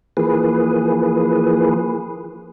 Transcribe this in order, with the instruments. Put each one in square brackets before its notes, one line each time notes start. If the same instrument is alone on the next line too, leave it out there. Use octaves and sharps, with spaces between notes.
[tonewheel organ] E3 F3 A#3 G#4 B4